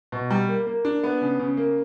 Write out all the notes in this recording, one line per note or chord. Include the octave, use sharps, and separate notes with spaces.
B2
G3
A#3
A#3
D4
B3
C#3
C#3
A#3